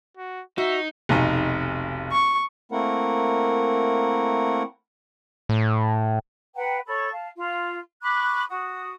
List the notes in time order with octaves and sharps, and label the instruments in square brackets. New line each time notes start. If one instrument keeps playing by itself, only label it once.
[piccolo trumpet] F#4
[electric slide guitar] D#4 [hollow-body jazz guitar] F#4 [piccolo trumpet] E5
[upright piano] F1 B1 D#4
[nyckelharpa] C#6
[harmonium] A3 A#3 C4 E4 A#4 F#5
[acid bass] A2
[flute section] B4 F#5 G5 A#5
A4 C#5 B5 C#6
F5 A5
F4
B5 C#6 D6 F#6
F#4 D#6